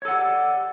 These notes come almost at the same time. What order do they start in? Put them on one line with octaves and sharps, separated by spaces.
C#5 A4 F#5 G4 D5